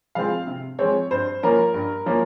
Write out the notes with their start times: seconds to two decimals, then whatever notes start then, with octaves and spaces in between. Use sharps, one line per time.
0.15 F3 G#3 C4 F5
0.47 C3
0.79 F3 G#3 C4 C#5
1.11 G2 C5
1.43 F3 A#3 C#4 A#4
1.74 G2
2.06 F3 A#3 C#4